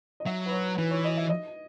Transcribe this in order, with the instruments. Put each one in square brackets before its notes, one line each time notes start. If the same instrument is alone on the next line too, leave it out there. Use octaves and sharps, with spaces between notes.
[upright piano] D#5
[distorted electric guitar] F#3 [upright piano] E5
[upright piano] B4
C#5
[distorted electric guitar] E3 [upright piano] B4
[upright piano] C#5
D#5
E5
D#5